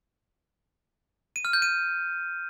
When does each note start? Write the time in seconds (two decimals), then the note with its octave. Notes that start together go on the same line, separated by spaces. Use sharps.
1.36 D#7
1.45 F6
1.53 G6
1.62 D#7